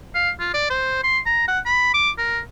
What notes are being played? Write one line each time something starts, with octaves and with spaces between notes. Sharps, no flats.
F5
F4
D5
C5
C6
A#5
F#5
B5
D6
A#4